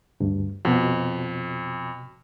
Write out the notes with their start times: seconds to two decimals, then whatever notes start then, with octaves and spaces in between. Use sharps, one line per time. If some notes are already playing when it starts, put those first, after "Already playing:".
0.20 D2 G2
0.65 F2 B2 F#4